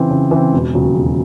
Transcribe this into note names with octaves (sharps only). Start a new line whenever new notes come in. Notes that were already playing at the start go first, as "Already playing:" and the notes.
Already playing: C#3 E3 C4
C#3
E3
C4
E1
D#2 C#3 F#3
E1